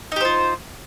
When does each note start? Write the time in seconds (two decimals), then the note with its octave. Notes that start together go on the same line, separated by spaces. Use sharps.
0.12 D#4
0.16 G4
0.21 C5
0.25 F4